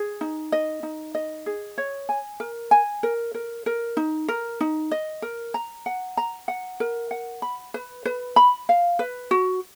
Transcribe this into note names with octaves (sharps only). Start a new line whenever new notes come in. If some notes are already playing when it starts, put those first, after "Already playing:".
Already playing: G#4
D#4
D#5
D#4
D#5
G#4
C#5
G#5
A#4
G#5
A#4
A#4
A#4
D#4
A#4
D#4
D#5
A#4
A#5
F#5
A#5
F#5
A#4
F#5
B5
B4
B4
B5
F5
B4
F#4